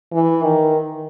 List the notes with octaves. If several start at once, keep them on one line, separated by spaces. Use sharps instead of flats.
E3
D#3